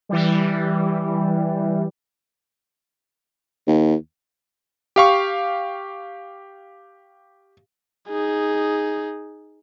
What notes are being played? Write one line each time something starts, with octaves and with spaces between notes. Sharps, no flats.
E3 G3
D#2
G4 F5 C#6
D#4 G#4